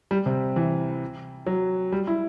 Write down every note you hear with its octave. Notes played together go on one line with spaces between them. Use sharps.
G3
C3
E3
F#3
G3
E4